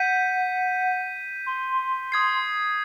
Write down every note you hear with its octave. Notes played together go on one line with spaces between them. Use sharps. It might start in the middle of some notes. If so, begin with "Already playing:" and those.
Already playing: F#5 G6 B6 D#7
C6
D#6 G#6 C7